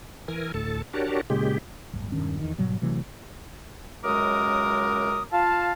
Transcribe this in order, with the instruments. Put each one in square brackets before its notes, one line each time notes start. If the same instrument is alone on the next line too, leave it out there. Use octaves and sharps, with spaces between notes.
[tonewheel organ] E3 A#4 G#5
D2 A2 A4 A5
D4 F#4 G4 A#4 C#5 A5
A#2 C#3 G#3 G4
[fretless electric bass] D1 G1
E1 G2 D#3 C#4
E2 D#3
G#2 B2 F#3 G3
C3 E3 F#3 A3
[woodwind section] C#2 F#2 G#3 A#4 D6 D#6
F4 F5 A5